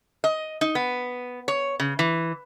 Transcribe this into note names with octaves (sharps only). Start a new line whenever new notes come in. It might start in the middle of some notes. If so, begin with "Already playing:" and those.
D#5
D#4
B3
C#5
C#3
E3